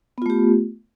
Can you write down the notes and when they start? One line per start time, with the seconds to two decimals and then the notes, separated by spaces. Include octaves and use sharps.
0.18 B3
0.22 F4
0.26 A3
0.30 G4